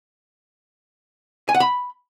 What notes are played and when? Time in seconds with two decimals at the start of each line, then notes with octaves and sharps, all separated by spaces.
1.49 G#5
1.55 F#5
1.60 B5